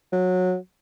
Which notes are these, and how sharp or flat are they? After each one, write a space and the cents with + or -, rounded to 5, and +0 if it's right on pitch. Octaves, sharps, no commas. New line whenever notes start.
F#3 -20